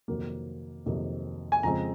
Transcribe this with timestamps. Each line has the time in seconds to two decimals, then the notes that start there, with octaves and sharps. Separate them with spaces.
0.08 F2 C3 D#3 F#3 A#3
0.86 F2 C3 D#3 F#3 A#3
1.52 G#5
1.63 F2 C#3 F3 G#3 C4 A#5